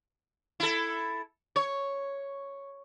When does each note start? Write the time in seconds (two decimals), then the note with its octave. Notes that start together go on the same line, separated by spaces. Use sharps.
0.60 E4 A4
1.56 C#5